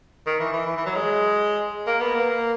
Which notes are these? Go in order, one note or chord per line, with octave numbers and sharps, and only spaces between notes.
D#3
E3
E3
E3
E3
F#3
G#3
A#3
B3
A#3